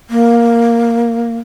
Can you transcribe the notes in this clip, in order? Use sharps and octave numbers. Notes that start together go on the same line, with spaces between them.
A#3